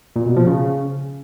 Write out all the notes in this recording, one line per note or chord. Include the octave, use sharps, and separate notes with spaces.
A#2
B2
F3
C#3